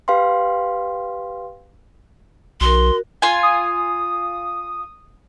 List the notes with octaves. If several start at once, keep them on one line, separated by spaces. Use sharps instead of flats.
G4 B4 F5 G5 C6
B1 F#4 A#4 C6
F4 G#5
D#6